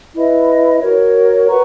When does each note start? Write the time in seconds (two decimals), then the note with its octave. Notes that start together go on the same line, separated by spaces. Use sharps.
0.14 E4 B4 D#5
0.81 F#4 A#4 C#5
1.48 B4 F#5 A#5 C#6